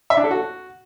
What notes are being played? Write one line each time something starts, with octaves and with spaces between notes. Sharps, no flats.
E5
D4
A4
F#4